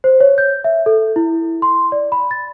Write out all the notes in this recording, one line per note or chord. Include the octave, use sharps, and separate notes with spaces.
C5
C#5
G6
E5
A4
E4
C6
D5
B5
A6